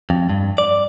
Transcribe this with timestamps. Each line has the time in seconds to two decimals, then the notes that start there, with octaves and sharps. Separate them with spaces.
0.10 F2
0.29 G2
0.58 D5